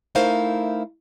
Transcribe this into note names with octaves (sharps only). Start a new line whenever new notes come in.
A3 D#4 E4 A#4 C5 F5